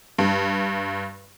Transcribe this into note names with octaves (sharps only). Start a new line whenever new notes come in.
G2